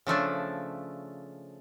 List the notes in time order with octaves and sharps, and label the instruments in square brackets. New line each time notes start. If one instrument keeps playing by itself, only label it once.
[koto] C#3 F3 A3 D4